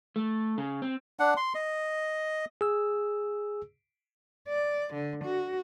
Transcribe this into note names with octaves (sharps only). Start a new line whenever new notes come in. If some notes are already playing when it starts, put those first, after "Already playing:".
A3
C#3
C4
D4 F#5
C6
D#5
G#4 E6
D5
D3
F#4